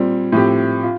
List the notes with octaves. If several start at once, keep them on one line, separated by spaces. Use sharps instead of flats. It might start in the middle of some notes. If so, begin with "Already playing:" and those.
Already playing: A#2 G3 C4
A2 F3 C4 G4
F4